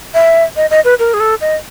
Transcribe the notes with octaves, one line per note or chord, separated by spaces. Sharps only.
E5
D#5
D#5
B4
A#4
G#4
A4
D#5